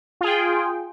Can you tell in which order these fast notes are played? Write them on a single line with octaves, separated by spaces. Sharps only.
F4 G#4 G5